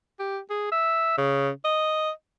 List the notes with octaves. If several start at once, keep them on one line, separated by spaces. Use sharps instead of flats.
G4
G#4
E5
C#3
D#5